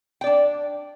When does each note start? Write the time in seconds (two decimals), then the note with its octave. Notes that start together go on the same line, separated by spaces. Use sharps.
0.21 G5
0.24 D5
0.26 D4